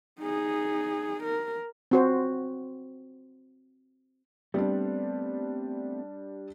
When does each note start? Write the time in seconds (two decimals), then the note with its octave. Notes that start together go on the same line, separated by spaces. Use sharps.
0.20 D#4 G#4
1.23 A#4
1.91 C4 F#4 C5
4.54 G3 A3 B3 C4 D4